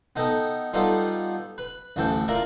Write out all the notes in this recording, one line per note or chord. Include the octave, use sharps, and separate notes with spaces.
B3 D#4 A4 D#5 G5
G3 B3 D#4 F4 A4
B4
A1 D2 E3 A4 G5
E4 F4 A#4 D5